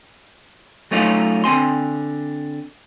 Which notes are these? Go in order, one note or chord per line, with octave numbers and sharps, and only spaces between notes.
F#3 A3 C#4 D#4 F4
D3 C4 G#5 C6